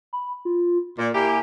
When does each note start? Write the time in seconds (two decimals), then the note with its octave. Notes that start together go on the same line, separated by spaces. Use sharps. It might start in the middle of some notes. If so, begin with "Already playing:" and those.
0.13 B5
0.45 F4
0.98 A#2 D5
1.15 A#3 E4 G4 G#5